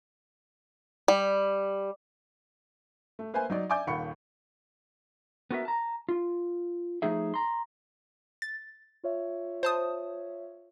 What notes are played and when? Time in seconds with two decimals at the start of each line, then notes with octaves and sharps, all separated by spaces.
1.08 G3
3.19 A3
3.34 A#3 B4 C5 E5 G#5
3.50 F#3 D#4 D5
3.70 D5 E5 G#5 D6 G6
3.87 D#1 D#2 F#5 B5 C#6 C#7
5.51 B3 F#4 A#4 E5
5.65 A5 A#5
6.09 F4
7.02 F3 A3 D#4 G#4 E5
7.34 A#5 C6
8.42 A6
9.04 F4 C#5 E5
9.63 C5 A5 D#6